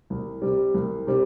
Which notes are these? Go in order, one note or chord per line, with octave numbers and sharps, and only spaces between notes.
C2
C3 G3
C2
C3 G3